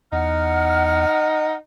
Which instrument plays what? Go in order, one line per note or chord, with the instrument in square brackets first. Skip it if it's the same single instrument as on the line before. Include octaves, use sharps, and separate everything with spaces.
[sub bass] E2 [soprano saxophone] D#4 [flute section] F#5 F6